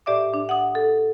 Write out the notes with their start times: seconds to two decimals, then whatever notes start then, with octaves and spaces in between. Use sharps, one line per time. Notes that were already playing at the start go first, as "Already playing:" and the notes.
0.06 A2 G4 D5 E5 D6
0.34 D4
0.49 F#5 D#6
0.75 A4